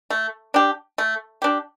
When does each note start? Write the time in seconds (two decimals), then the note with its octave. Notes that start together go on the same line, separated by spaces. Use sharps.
0.10 A3
0.54 D4 G4
0.98 A3
1.42 D4 G4